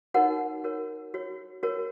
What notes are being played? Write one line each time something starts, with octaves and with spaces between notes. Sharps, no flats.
D#4 F#4 A#4 C#5 F#5
F#4 A#4 C#5
F#4 C#5
F#4 A#4 C#5